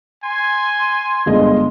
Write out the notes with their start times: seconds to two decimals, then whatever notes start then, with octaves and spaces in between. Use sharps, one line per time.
0.24 G#5 C6
1.26 G1 G#3 D#5